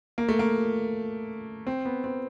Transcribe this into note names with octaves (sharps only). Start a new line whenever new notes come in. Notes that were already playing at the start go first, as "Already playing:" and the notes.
A#3
A3
A#3
C4
B3
C4